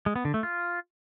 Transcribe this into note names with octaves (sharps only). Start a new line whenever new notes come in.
G#3
B3
D3
A3
F4